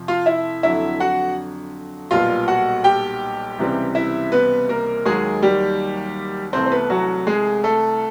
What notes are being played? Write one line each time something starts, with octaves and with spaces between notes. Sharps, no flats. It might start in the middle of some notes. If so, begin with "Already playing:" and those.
Already playing: F2 C3 F3
F4 F5
E4 E5
F2 D3 F#3 E4 E5
F#4 F#5
B1 A#2 G3 B3 F4 F5
F#4 F#5
G4 G5
C#2 C3 E3 G3 C4
E4 E5
B3 B4
A#3 A#4
D#2 D#3 F#3 G#3 A#3 G#4
G3 G4
C2 C3 E3 A3 C4 C5
C5
B3 B4
F#3 F#4
G#3 G#4
A3 A4